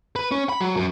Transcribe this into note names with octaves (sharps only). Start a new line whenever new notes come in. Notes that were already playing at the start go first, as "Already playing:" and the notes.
B4
C#4
B5
F#3
F#2